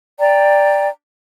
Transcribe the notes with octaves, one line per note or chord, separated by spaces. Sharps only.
D5 G5 A#5